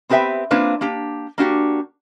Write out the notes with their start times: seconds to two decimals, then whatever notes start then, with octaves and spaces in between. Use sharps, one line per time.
0.09 B3 C4 G4 B4 E5 G5
0.51 A#3 C4 D4 F4 B4
0.81 A#3 D4 G4
1.38 A#3 D4 F#4 G4